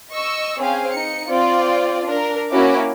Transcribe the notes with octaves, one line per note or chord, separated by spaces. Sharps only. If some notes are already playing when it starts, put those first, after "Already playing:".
D#5 C#6 E6
C4 C#4 G#4 F5 G#5
D#4 C#7
C4 F4 C5 D5
D4 A#4
A#3 C#4 E4 F#4 D6